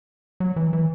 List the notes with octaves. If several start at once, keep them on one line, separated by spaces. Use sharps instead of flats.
F#3
E3
E3